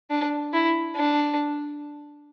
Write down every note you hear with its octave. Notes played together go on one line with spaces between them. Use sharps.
D4
E4
D4